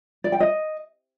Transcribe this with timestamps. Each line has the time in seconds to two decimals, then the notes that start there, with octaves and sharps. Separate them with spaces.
0.24 D5
0.32 G5
0.40 D#5